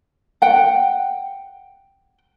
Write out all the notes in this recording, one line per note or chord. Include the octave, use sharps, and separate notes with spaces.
F#5 G5